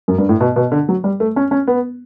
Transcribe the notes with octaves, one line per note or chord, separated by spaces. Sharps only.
F#2
G2
A2
B2
B2
D3
F#3
G3
A3
C#4
C#4
B3